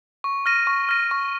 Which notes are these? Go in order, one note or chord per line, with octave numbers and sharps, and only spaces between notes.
C#6
F6 A#6 D#7
C#6
F6 A#6 D#7
C#6